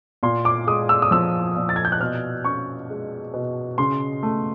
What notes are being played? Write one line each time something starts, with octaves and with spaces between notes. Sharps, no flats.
A#2 C6
D6
G#3 D#6
E6
D#6
F3 E6
A#2
A6
G#6
G6
F#6
B2 F6
C#4 C#6
G#3
B2
C#3 C6
A3